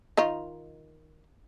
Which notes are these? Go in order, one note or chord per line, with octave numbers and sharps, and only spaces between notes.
D#3 D#4 F4